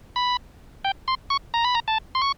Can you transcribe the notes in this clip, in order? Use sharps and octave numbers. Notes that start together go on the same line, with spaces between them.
B5
G5
C6
C#6
A#5
B5
A#5
A5
C6
C#6